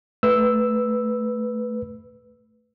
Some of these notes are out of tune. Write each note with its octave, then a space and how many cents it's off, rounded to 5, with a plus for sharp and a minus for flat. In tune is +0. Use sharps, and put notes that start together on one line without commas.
A3 +0 B4 +0 E6 +0